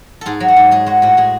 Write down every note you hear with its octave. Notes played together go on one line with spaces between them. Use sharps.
G#2 G#4 A4
F#3
F#4
G#2
G#3 G#4
G#3 F#4
A2 F#4
G#3 G#4